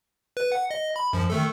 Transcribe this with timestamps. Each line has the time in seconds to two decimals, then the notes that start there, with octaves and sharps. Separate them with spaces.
0.37 B4
0.52 F#5
0.71 D#5
0.96 B5
1.13 F#2 F3
1.30 D#3 A3 A4